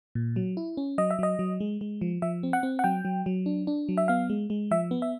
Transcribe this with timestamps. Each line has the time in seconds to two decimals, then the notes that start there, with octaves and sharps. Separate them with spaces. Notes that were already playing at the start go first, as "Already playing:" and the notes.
0.15 A#2
0.36 F#3
0.57 E4
0.77 C#4
0.98 F#3 D#5
1.11 E5
1.19 F#3 D#5
1.39 F#3
1.60 G#3
1.81 G#3
2.01 F3
2.22 F3 E5
2.43 C4
2.53 F#5
2.63 C4
2.79 F#5
2.84 F#3 G5
3.05 F#3
3.26 F#3
3.46 D4
3.67 D4
3.89 F#3
3.97 E5
4.08 B3 F5
4.30 G#3
4.50 G#3
4.71 F3 E5
4.91 B3
5.02 E5